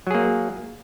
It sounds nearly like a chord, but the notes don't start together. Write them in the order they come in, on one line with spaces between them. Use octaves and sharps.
F#3 G#4 A#3